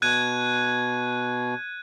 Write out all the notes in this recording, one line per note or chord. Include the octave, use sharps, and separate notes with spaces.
B2 F#6 G#6 D#7